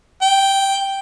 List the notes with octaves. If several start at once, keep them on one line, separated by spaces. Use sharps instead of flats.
G5